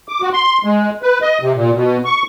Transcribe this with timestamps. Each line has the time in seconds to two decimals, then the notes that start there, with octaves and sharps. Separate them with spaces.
0.08 D6
0.22 F#4
0.33 C6
0.65 G#3
1.03 B4
1.22 D#5
1.42 C3
1.55 A#2
1.74 B2
2.05 C#6